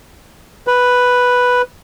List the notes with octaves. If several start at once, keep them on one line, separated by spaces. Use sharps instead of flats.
B4